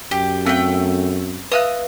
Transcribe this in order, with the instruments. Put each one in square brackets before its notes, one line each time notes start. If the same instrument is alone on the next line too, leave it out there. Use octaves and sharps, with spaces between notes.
[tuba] F#2 [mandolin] G4
[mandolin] A3 G5 [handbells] C4
[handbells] B4 E5 F5 [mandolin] D#6 F6 F#6